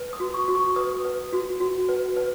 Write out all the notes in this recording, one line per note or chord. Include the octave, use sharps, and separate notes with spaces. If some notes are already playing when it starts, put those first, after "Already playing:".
Already playing: B4
D#6
F#4
C#6
F#4
C#6
B4 D#6
B4
F#4
F#4
B4
B4